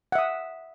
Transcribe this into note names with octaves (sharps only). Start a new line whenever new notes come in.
E5 F#5 D#6